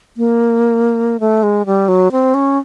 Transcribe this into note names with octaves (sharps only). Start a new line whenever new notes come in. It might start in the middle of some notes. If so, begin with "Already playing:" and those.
A#3
A3
G#3
G3
F#3
C4
C#4